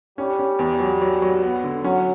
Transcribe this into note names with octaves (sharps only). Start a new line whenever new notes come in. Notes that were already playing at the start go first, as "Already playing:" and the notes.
G3 C#4
C#4
E2
F#3
F#3
F#3
B3
D3
F#3 C#4